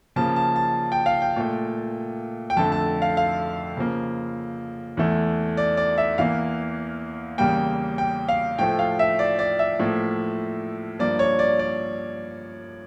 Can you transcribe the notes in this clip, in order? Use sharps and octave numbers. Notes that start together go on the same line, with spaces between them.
C#3 F3 A#3 A5
A5
A5
G5
F5
G5
A#2 A3
G5
F2 D3 A3 A5
A5
F5
F5
C#3 F3 A#3
E2 E3 A3
D5
D5
E5
E2 E3 A#3 F5
E2 C#3 G3 A#3 G5
G5
F5
A2 F3 A3 G5
F5
E5
D5
D5
E5
A2 F3 A#3
G2 F3 A#3 D5
C#5
D5
D5